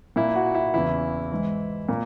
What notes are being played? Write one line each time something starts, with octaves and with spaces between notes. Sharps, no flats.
A#2 E4
F#4
E4
E2 C#3 E3 E4
G#2 E3
A#2